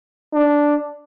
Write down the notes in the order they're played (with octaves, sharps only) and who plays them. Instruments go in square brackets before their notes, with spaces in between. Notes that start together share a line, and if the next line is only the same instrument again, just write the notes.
[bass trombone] D4